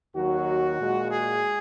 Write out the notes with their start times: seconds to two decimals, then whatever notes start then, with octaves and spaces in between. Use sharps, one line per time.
0.14 D#2 D#3 F#3 F#4
0.78 A#2 G#3
1.10 G#4